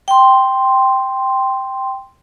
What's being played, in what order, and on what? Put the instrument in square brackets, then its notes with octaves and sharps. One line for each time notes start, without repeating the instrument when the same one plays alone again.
[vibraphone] G5 C6